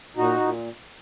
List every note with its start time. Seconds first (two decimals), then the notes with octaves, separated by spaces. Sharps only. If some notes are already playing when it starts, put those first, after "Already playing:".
0.16 A#2 D#4 F#4
0.40 A#2